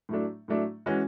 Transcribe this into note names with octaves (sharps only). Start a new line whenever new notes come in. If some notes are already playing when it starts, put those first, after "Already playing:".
A2 F#3 A3 D4
A2 F#3 A3 D4
E3 G#3 C#4 F#4